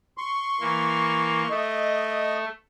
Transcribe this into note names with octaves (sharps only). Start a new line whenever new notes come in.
C6 C#6
E3 A#3
A3 D#5